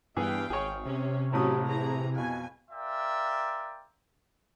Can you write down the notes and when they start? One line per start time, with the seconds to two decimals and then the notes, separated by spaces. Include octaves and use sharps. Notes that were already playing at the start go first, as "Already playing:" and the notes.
0.17 G2 E3 B3 G#4 F5 G5
0.50 G#1 G#4 C#5
0.86 C3 C#4
1.32 A1 A2 F#3 C#4 G4 D#6
1.67 E3 G#4 A#5
2.15 F2 B2 G#5
2.70 F4 A#4 D5 E5 G5 G#5